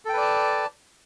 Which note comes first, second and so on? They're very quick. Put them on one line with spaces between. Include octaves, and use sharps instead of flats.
A4 G5 B4 D5 A5